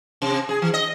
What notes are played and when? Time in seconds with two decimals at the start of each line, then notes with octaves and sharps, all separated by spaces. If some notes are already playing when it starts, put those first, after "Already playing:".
0.22 C3
0.49 G#4
0.62 E3
0.74 D#5